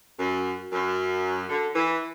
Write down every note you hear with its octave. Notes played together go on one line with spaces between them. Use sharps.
F#2
F#2
D3
E3